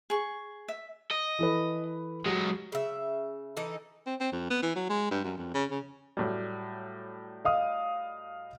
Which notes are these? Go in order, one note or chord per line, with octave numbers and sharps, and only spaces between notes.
G#4 C#6
E5
D#5
E3 A4 B4
F#3 G#3 F#4 G4
C#3 E5
E3 D#4 A4
C4
C4
F2
B3
E3
F#3
G#3
G2
F#2
F2
C#3
C#3
A2 F#3 G3
D#5 F5 D#6